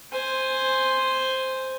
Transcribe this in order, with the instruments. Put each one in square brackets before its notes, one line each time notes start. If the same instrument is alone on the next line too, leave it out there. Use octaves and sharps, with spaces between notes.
[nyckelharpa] C5 G#5